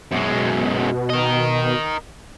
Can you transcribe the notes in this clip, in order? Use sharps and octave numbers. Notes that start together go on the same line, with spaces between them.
F#2 B2 G#3
A#4 D#5